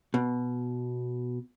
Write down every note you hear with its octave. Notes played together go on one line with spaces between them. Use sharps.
B2